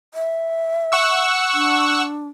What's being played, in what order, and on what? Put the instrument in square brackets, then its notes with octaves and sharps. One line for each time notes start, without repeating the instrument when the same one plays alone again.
[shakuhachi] E5
[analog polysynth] F#5 C#6 E6
[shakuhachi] D4